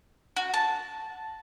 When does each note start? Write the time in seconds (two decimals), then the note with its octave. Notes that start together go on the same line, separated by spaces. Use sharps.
0.37 F#4
0.54 A5